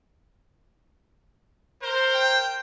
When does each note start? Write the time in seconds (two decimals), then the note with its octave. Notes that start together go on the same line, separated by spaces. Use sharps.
1.82 A#4 C5
2.14 G5